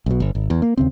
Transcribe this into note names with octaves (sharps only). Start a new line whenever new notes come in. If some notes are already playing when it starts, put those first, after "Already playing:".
B1 B2
G1
G#1
E2
A#3
D#2 C#3 C4